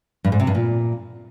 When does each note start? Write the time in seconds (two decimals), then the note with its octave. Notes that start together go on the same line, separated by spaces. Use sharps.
0.24 G2
0.32 G#2
0.40 C3
0.47 G2
0.55 A#2